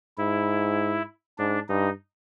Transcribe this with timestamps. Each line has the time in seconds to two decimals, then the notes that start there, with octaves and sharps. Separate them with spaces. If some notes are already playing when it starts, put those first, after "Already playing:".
0.17 G#2 E4
1.38 G#2 D4
1.69 G2 D#4